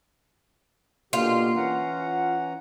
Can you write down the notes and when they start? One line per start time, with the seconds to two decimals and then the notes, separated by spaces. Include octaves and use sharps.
1.13 B2 D3 A#3 F4 G4
1.56 E3 C#4 F#5 A#5